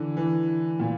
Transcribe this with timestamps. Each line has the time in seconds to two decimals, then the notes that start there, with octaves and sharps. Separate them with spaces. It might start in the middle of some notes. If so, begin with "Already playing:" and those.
Already playing: D3 E3
0.17 E3
0.80 A#2